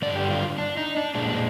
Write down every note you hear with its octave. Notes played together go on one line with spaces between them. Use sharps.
G2 D3 G3 D5
G4
F4
D4
D#4
D4
A#2 G#3 D4
D4